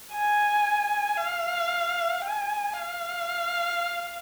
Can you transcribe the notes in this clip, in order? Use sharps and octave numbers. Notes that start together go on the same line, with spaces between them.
G#5
F5
G#5
F5